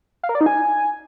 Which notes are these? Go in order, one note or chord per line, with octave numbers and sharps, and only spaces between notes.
F5
A#4
D5
D#4
G#5